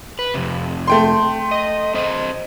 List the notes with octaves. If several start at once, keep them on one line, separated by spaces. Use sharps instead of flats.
B4
F2 C3
A3 G5 C6
D#5
C4 C5 D#5